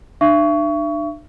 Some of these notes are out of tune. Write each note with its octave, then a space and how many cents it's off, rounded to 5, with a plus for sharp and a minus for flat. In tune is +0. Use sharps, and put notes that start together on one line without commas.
D4 +40 E5 +40 C#6 +25